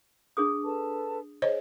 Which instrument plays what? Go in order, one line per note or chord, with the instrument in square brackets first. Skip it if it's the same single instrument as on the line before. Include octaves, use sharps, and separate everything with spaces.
[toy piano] D4 G#4 D#6
[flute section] A4 B4 A5
[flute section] G#4 [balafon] C5 C#5 D#5